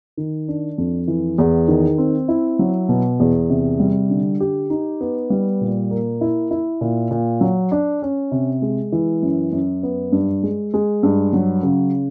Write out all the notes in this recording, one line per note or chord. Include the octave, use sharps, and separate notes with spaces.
D#3
D4
F2
E3
E2
D#3
C4
E4
F#3
B2
E2
C3
G3
D3
G4
D#4
B3
G3
A#2
A#3
E4
E4
A#2
A#2
F#3
D4
C#4
C3
G#3
E3
F#2
F#2
B3
G2
G#3
G#3
G2
F#3
C#3